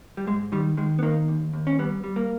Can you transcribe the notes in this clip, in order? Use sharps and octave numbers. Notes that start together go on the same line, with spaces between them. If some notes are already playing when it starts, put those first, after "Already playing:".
G3
G#2 G#3
D#3 G3
D#3 G#3
B3
D#3 A#3
D#2
D#2
C#4
G3 B3
G3
A#3